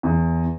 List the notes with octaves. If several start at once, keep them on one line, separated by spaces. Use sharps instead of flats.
E2